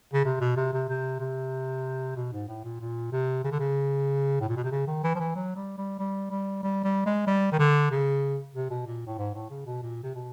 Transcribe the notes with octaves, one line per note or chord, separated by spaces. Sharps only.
C#3
C3
B2
C3
C3
C3
C3
B2
G#2
A2
A#2
A#2
C3
C#3
D3
C#3
A2
A#2
B2
C3
C#3
D#3
E3
F3
E3
F#3
G3
G3
G3
G3
G3
G3
G#3
G3
D#3
D3
C#3
C3
B2
A#2
A2
G#2
A2
C#3
B2
A#2
C3
B2